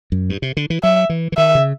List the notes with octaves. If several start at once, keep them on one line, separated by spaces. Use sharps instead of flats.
F#2
G2
C3
D3
E3
F#3 E5
E3
E3
D#3 E5
C#3